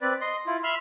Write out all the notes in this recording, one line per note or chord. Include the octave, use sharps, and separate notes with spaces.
C4 B4 D5
D#5 C6
E4 F4
E5 B5 C6 E6 F6